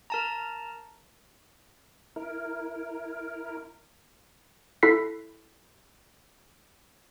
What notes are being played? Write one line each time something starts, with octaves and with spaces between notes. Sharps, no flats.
A#4 A5 A#5
E4 A#4
E4 A4 B6 C7